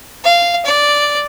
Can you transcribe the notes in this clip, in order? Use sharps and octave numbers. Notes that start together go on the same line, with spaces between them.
F5
D5